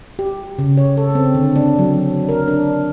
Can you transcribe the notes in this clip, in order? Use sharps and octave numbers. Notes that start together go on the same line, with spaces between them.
G4
C#3
C#5
A4
C4
D3
D4
F#3
A#4
D4